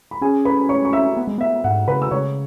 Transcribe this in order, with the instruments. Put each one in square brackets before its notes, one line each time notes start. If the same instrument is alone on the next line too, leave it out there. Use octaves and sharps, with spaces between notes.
[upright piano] B5
[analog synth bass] C#4 [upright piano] G#4 G#5
[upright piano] B4 B5
C#5 C#6
C#6
E5 E6
[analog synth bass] B3
G#3
[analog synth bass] B3 [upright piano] E5
[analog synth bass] G#2 [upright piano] F#5
[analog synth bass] C#3 [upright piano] B4 B5
[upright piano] E6
[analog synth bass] C#3 [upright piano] C#5 C#6